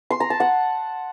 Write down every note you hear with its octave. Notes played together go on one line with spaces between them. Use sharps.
C6
A#5
A5
F#5